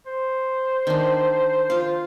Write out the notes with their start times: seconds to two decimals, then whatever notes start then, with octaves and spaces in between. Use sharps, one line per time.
0.07 C5
0.87 D#3 D4
1.70 F4 F5